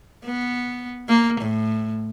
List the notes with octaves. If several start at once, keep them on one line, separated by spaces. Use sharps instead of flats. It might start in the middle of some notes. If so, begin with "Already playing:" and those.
B3
A#3
A2